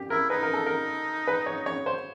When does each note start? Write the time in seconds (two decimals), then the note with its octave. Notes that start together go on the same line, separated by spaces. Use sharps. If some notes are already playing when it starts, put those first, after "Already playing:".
Already playing: G4
0.10 E4 A#4
0.30 D#4 B4
0.43 A#4
0.54 A4
0.67 A#4
1.27 B4
1.46 C#5
1.66 C#5
1.86 C5